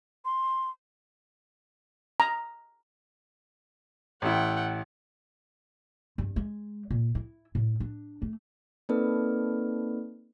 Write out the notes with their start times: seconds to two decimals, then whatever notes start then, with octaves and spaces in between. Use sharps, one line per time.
0.25 C6
2.20 A#5
4.22 A1 E4 F#5 G5
6.18 G2
6.36 G#3
6.90 A#2
7.15 E4
7.55 A2
7.80 D4
8.22 A3
8.89 A#3 C4 D#4 A4 B4 D5